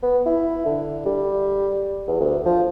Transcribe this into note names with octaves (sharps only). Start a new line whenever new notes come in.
B3
E4
D3
G3
E2
D2
F3